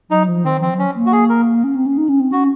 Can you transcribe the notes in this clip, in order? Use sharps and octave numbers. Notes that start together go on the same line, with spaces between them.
F#3 D#4
F3
D#3 C4
F3 C4
F#3
C#4
A#3
F#4
G#4
A#4
C#4
C4
C#4
D#4
C#4
C4
C#4 F#4